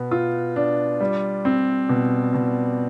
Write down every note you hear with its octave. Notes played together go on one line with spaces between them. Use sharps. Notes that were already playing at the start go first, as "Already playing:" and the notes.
Already playing: B2 B3
F4
D4
G3
C4
B2
B2